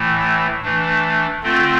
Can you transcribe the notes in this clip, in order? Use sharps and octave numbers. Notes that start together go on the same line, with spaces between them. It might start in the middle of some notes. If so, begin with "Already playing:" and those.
Already playing: A2 E3 A3
E3 A3 D4
D3 A3 C4 F4